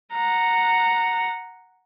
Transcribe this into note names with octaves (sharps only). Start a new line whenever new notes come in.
F#5 A#5